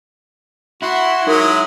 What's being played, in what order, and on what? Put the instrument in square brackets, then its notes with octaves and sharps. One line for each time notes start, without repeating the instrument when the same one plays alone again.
[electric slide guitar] E4 [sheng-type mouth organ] F#4 F#5 C6
[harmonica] F#3 G#3 [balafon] D#4 A#4